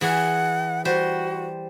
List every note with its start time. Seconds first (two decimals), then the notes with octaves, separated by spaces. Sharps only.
0.01 E3 G#4 F#5
0.85 G3 F#4 C5